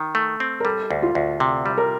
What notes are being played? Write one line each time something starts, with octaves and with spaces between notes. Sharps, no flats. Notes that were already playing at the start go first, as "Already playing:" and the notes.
Already playing: D#3
A3
C4
A#4
G3 A4
D2
F4
D2
C3
G3
A#4